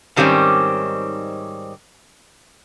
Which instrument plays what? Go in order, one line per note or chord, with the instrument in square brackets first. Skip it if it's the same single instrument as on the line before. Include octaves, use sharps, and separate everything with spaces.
[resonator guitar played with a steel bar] G#2 D#3 G3 A#3 C4 C#4